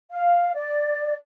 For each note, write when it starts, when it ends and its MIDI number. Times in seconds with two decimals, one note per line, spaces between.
0.10 0.52 77
0.54 1.14 74